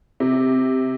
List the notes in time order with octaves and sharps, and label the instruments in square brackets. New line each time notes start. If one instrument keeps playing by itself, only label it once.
[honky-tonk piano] C3